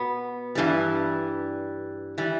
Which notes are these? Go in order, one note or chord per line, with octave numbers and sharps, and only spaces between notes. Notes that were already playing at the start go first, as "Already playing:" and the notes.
Already playing: B2 B3
G2 E3 G3
E3 G3